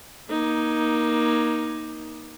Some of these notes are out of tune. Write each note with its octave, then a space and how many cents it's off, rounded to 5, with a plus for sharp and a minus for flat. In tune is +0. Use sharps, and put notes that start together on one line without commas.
A#3 +25 D#4 +5